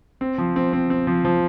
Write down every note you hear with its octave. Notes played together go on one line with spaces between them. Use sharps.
C4
F3
C4
C4
C4
F3
F3